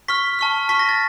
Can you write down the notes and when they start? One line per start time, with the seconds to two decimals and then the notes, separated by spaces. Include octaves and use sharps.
0.08 C#6 F6 B6
0.39 A5 C#6 F6
0.69 A5 C#6 F6 B6
0.79 A#6
0.89 A6